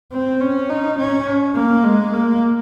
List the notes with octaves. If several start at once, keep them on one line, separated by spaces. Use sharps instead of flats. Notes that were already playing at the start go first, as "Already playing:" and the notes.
C4
C#4
D#4
C#4
A#3
G#3
A#3